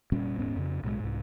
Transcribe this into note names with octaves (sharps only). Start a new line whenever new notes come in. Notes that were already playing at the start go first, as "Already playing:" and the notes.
F1 A#2 G3 C#4
D#1 G#2 B3 C#4
F2 C#3
B1 A2 E3 G#3
C2 G#2